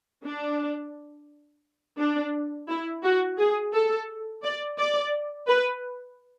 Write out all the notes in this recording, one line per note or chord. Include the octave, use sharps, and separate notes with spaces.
D4
D4
E4
F#4
G#4
A4
D5
D5
B4